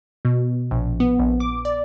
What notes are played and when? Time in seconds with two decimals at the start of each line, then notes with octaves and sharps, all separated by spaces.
0.25 B2
0.71 A#1
1.00 B3
1.19 A#1
1.40 D6
1.65 D5